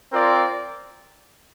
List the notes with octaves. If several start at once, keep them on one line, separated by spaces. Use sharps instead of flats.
C4 F4 A#4 D5